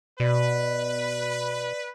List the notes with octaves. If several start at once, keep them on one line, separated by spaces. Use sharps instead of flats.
B2 B4 D5